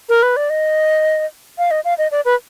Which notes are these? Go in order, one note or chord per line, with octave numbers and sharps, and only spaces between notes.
A#4
B4
D5
D#5
F5
D#5
F5
D#5
D5
B4